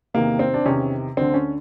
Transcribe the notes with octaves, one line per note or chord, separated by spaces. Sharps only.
E2 C3 D#3 A#3
C4
D4
E2 C3 D#3 C#4
D2 D3 C4
C#4